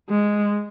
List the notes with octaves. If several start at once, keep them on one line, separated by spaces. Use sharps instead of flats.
G#3